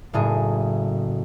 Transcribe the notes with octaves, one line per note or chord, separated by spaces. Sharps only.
F#1 A2 G#4